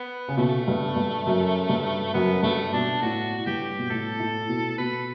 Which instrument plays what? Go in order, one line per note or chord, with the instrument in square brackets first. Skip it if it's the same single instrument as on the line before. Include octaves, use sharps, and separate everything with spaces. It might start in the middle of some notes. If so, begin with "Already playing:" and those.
Already playing: [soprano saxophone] B3
[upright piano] C#3
[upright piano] B2 [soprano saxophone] A3
[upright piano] G2
G2
F#2
G2
[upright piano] F#2 [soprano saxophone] B3
[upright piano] G2 [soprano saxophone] A3
[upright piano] B2 [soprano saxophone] D4
[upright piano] A2 [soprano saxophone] F#4
[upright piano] G2 [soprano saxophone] G4
[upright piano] B2
[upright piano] A2 [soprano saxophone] A4
[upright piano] A2
B2
[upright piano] B2 [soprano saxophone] B4